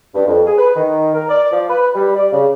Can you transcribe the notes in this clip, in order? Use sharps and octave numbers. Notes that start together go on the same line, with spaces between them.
G2
F2
G#4
B4
D#3
A#4
D5
F3
B4
G3
D5
C#3